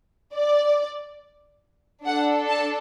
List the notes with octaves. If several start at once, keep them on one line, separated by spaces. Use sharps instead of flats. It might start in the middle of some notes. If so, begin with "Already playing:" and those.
D5
D4 A4 F#5
A5